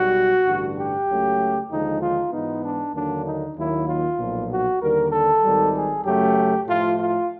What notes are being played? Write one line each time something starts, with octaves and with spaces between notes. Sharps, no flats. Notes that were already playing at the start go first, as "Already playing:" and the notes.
Already playing: B1 B2 G3 F#4
A1 G2 D3
G4
C#2 C#3 F#3 A3
D#2 D3 F3 G#3 D#4
F4
G#2 E3 G#3 B3 D#4
D4
D#2 D3 F#3 A#3 D4
D#4
D#2 D#3 F#3 A#3 E4
F4
B1 A#2 F3
F#4
D#2 D3 G3 A#4
A4
G#1 G#2 D#3 G3
G#4
F#2 C#3 F#3 A3 G4
A2 F3 A3 F4
F4